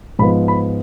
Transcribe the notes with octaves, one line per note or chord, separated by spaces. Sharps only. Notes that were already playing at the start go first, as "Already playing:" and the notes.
G#2 F3 B3 B5
B5